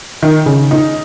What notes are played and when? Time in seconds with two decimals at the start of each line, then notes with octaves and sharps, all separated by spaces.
0.23 D#3
0.46 C#3
0.71 D#4